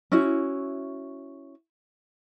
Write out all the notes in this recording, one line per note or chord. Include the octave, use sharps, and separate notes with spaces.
C#4 E4 F#4 E5